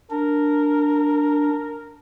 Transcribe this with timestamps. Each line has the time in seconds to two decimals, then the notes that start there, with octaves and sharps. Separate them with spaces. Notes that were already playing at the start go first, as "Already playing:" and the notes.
0.11 D4 A#4